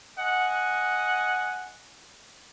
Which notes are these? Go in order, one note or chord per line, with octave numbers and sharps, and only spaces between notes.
D#5 F#5 G#5